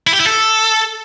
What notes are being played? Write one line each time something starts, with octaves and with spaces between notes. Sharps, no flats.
E4
G4
E4
A4